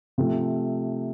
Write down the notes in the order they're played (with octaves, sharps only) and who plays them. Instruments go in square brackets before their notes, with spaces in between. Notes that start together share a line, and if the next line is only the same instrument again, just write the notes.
[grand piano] C3 F3 A3